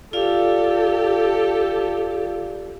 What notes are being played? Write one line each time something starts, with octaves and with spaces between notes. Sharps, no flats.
F4 G4 A4 D5 F5